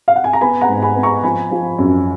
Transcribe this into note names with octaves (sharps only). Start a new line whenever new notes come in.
F5
F#5
G#5
A#5
B3 G#5 B5
F#5 A#5
G#2
G#5 B5
B3
A#5 C#6
F3 G#5 B5
F3
F#2